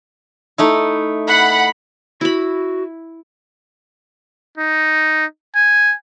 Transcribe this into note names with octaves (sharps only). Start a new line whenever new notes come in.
A3 D#4 E4
F#5 B5
E4 F#4 B5
D#4
G#5